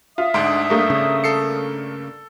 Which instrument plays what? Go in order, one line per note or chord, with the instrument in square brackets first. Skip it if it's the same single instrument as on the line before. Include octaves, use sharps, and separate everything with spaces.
[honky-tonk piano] F4 [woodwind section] E5 D#6
[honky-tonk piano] D2 C6 D7 [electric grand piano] G#2 D4
[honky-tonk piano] G2 A3 A#3
[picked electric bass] C#3
[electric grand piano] A4 C7 C#7